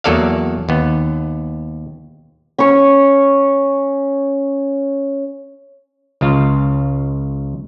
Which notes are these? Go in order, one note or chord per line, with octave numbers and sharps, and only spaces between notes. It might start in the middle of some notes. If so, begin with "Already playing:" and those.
E2 F#3 A#3 A4 D5 F5
D#2 B3
C#4 C#6
C#2 C#3 F4